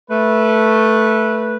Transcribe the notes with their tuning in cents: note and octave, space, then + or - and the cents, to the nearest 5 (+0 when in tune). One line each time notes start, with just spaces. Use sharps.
A3 +0 B4 -15